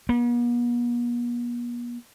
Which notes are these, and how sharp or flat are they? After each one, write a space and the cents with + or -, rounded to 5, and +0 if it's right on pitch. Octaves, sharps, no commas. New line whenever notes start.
B3 -45